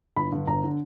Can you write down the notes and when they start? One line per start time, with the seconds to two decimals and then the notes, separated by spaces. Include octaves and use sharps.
0.16 G1 B5
0.32 G2 D3
0.47 G1 A#5
0.64 D3